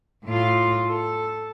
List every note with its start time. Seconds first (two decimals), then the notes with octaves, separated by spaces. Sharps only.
0.25 A2 F4
0.87 A4